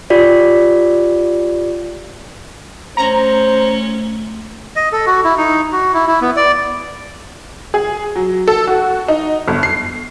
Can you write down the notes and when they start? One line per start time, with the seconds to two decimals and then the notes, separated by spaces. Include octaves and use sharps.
0.10 F4 G4 D5
2.97 A3 C#4 C5 A#5
4.76 D#5
4.92 A4
5.07 F#4
5.24 E4
5.38 D#4
5.72 F#4
5.94 E4
6.07 E4
6.21 B3
6.36 D5
7.74 G#4
8.16 F#3
8.48 A4
8.67 F#4
9.08 D#4
9.48 G1
9.63 C7